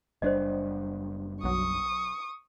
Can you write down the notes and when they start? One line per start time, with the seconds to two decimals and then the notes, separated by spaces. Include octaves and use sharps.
0.22 F#1 G3 D4 C5 D5 D#5
1.44 B1 F#3 C#6 D#6